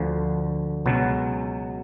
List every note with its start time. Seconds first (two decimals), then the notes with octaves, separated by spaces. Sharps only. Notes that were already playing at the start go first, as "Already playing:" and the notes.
Already playing: D2 D3 F3
0.86 C#2 B2 F#3